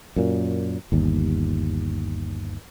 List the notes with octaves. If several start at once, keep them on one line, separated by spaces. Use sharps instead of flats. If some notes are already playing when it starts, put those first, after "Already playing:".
F#2 A#2
G1 D#2